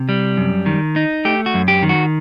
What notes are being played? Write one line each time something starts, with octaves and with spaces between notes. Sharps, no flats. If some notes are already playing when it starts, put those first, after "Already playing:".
Already playing: C3
G3
F#2
D#3
D#4
A3 G4
F#4
F#2
G4
D#3
F#4